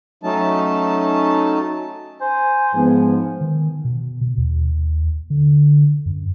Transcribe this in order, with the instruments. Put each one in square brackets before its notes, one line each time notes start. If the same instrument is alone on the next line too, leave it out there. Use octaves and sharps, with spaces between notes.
[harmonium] F#3 A3 C#4 D#4 A5
[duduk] C5 [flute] G#5
[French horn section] G#2 B3 [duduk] F3
[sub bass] D#3
B2
B2
D#2
D3
F#2